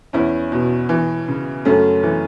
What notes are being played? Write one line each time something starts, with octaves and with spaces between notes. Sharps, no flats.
E2 C#4 E4
B2
E3
C#3
F#2 A3 C#4
E3